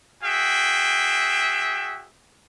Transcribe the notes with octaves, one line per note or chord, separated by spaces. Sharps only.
F#4 G#4 E5 G5